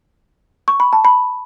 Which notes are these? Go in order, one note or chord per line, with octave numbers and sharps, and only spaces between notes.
C#6
B5
A5
B5